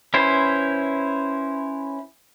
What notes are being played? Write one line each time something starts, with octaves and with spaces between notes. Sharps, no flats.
C#4 E4 B4 C5